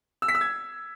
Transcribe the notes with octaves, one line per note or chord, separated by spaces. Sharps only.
E6
B6
E6
G#6